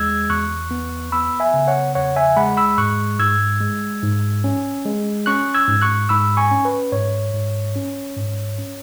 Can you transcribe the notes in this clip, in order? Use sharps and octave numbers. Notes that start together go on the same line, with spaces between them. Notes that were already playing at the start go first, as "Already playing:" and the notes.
Already playing: E2 G#3 E6 G#6
E2 C#6 F#6
B3
B3 B5 E6
E5 G#5
C#3
C#5 F#5
E2 C#5 F#5
E5 G#5
G#3 F#5 B5
B5 E6
G#2 C#6 F#6
G#2 E6 G#6
G#3
G#2
C#4
G#3
C#4 C#6 F#6
E6 G#6
G#2
C#6 F#6
G#2 B5 E6
G#5 C#6
C#4
B4
G#2 C#5
G#2
C#4
G#2
C#4